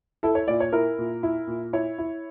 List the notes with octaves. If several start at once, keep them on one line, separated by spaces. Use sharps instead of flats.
E4 A4
C#5
A#2 D5
C#5
E4 A#4
A#2
E4
A#2
E4 C#5
E4